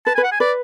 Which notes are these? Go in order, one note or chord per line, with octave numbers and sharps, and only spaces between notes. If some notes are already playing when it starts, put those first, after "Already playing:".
B4 A5
G#5
B4
F#5
G#5
B4 D5